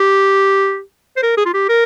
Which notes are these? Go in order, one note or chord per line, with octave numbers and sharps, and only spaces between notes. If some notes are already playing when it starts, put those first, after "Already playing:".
Already playing: G4
C5
A#4
G#4
F4
G4
A#4